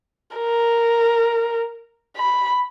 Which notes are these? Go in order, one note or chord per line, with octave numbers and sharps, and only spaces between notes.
A#4
B5